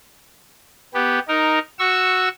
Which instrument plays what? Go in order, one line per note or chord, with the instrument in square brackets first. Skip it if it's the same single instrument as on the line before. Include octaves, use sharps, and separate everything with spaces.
[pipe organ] B3 G4
D#4 A#4
F#4 C#6 E6